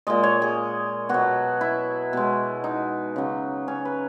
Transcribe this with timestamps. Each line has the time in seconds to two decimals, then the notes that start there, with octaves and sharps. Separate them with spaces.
0.07 A#2 G#3 D#5
0.23 C#5
0.42 G#4
1.09 B2 F#3 F#4
1.61 E4
2.13 B2 G#3
2.64 D#4
3.16 C#3 F#3
3.68 C#4
3.85 B4